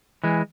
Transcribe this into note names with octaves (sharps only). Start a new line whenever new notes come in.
E3 G#3